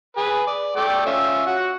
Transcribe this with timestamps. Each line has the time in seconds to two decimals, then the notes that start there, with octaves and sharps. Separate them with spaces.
0.17 G#4 B4
0.47 D5
0.76 A3 D5 G5
1.06 C#4 F4 E5
1.46 F#4 F#5